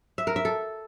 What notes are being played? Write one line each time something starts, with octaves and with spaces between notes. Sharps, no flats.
E5
A#4
E5
A4